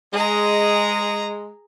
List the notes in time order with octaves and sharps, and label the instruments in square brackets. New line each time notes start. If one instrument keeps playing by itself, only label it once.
[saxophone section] G#3 [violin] G#4 A#5